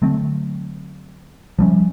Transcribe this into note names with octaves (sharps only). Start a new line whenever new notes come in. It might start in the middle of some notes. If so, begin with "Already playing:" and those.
D3 F#3 A3 C4
F3 G3 C#4